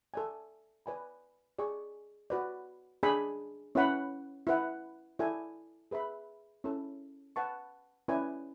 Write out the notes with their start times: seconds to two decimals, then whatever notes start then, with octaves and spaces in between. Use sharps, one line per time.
0.14 A4 D5 G#5
0.86 B4 D5 G#5 B5
1.59 G#4 D5 G#5 C#6
2.30 F#4 B4 D5
3.03 D4 G#4 D5 G#5 B5
3.75 C#4 E4 B4 F#5 B5
4.47 E4 B4 F#5
5.19 E4 A4 D5 G#5
5.91 G#4 B4 E5 B5
6.64 C#4 E4 A4
7.36 B4 F#5 A5 C#6
8.08 C#4 E4 B4 D5 G#5